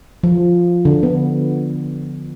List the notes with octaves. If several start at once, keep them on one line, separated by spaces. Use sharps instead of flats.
F3
D3
B3